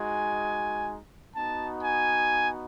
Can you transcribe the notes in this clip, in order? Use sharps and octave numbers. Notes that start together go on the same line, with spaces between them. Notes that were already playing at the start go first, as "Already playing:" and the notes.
Already playing: G#3 D#4 F#4 G#5
B3 D#4 F#4 A5
G#5